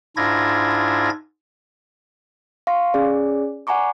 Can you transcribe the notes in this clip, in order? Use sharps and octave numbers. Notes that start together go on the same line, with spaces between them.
G#2 D4 E4 F4 G#6 A#6
F5 C6 C#6 A#6
C#4 G#4 D5
D5 F#5 G#5 A#5 C#6 D6